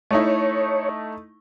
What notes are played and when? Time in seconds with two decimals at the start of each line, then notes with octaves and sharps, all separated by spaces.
0.11 A3 D#4 E4 C#5